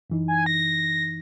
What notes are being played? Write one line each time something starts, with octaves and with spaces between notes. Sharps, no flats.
F#2 E3 D#4
G#5
A#6